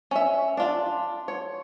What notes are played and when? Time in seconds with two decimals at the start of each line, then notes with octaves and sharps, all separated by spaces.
0.11 C#4 E5
0.57 D4 F4
1.28 C#5